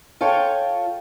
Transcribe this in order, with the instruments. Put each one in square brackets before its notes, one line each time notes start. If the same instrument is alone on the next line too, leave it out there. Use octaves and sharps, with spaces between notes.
[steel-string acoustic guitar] F4 A4 C#5 G5